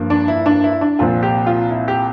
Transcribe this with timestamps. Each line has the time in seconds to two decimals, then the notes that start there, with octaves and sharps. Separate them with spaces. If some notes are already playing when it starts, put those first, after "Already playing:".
Already playing: G2 F3 A#3
0.10 D4
0.28 E4
0.46 D4
0.64 E4
0.81 D4
0.99 C2 A#2 F3 C4 F4
1.23 G4
1.47 F4
1.71 E4
1.88 G4